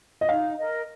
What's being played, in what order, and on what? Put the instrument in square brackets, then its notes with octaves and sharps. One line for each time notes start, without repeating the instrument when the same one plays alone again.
[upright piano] D#5
[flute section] D#4 [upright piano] F5
[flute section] A#4 D#5